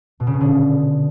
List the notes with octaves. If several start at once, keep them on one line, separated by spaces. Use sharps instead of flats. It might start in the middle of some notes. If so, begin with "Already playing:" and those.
B2
C#3
B2
D3